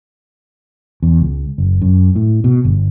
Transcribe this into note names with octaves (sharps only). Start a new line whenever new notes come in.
E2
C#2
F#1
F#2
A2
B2
G1